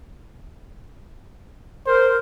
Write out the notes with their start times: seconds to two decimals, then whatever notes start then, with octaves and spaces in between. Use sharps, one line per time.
1.87 A#4 C5